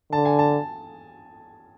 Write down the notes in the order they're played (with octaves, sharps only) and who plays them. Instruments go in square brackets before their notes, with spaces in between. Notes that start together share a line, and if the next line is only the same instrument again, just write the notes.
[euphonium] D3 [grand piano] A5
[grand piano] G#5
A5